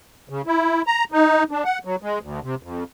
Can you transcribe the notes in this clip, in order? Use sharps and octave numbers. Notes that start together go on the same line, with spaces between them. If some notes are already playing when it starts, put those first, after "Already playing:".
C#3
E4
A#5
D#4
D4
F#5
F#3
G#3
D2
C3
F2